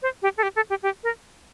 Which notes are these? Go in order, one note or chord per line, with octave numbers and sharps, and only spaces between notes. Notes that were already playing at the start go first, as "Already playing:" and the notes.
C5
G4
A4
G4
A4
G4
G4
A#4